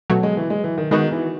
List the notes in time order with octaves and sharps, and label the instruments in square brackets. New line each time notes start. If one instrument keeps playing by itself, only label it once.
[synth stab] B2 F#3 A3
[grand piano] G#3
E3
G#3
E3
D#3
[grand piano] D#3 [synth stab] G#3 B3 D#4 F#4
[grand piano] E3